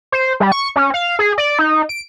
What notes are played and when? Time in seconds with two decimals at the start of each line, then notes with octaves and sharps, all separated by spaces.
0.12 C5
0.40 G3
0.52 C#6
0.76 C#4
0.94 F5
1.19 G#4
1.38 D5
1.59 D#4
1.89 D7